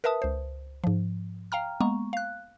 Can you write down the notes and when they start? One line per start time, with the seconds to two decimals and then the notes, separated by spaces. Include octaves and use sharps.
0.04 A#4 B4 E5 A5 D#6
0.22 C#2 C5
0.84 G#2 F3
1.52 F5 G5 A#5 F6
1.81 G#3 A#3 B3 A#5 C#6
2.13 F5 F#6